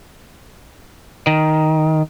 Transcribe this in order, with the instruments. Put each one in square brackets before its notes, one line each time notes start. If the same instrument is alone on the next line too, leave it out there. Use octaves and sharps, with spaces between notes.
[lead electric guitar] D#3